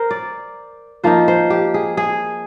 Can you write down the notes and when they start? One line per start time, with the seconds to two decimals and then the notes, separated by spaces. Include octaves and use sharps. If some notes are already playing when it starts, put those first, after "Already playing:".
Already playing: A#4 C5
0.11 D5
1.04 F3 A#3 D#4 C5
1.28 C5
1.50 G4
1.74 G#4
1.97 G#4